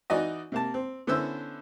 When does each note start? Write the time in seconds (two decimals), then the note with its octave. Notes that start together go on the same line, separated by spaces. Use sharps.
0.10 E3 D#4 F#4 D5 D#5
0.52 C3 A#3 A5
0.74 C4
1.07 D3 B3 C#4 E4 C5 E6